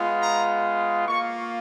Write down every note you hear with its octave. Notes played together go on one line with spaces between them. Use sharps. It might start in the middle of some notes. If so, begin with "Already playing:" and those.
Already playing: G#3 B3 F4
A#5
A#3 F4 C#6